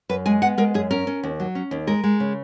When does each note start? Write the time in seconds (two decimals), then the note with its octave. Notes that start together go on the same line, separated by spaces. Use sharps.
0.09 F#2 B4
0.26 G#3 G#5
0.42 B3 F#5
0.58 G#3 A#4
0.74 F#2 G#4
0.91 C#4 A#4
1.07 C#4
1.23 D#2
1.40 F#3
1.55 C#4
1.71 D#2
1.87 G#3 A#4
2.04 G#3
2.20 C#3